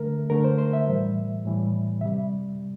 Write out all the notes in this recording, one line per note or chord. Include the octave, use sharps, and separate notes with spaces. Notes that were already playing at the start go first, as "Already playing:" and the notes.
Already playing: D3 A3 A#4
D3 A3 A#4
C5
C5
E5
A2 E3 G3
A2 E3 G3
C3 G3 E5